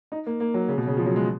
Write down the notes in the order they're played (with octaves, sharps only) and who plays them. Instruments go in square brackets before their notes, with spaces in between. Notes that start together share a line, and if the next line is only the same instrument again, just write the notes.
[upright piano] D#4
A#3
A#3
F#3
C#3
B2
C#3
F3
F#3
G#3